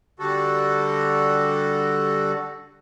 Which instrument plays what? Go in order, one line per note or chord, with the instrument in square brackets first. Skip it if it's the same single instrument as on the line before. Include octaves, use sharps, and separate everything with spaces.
[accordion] D3 G3 F#4 A4